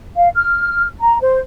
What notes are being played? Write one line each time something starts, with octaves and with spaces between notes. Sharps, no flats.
F5
F6
A#5
C5